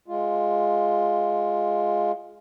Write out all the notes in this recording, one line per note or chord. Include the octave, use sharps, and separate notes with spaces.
G#3 F4